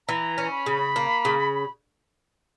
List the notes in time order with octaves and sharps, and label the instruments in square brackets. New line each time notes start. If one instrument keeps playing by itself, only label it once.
[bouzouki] E3 [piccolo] A#5
[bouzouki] C#4
[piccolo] B5
[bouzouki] C#3
A#3
C#3